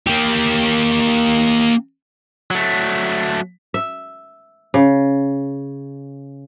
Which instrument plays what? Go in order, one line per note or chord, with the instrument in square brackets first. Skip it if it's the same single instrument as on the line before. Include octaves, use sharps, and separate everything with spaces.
[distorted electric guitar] A#3 G4
F#3 A3
[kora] E5
C#3